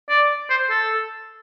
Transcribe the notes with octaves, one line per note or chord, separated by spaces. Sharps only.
D5
C5
A4